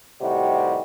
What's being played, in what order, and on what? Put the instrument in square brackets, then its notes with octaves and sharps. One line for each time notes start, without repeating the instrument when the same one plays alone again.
[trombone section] A2 C3 D#3 G3 F#4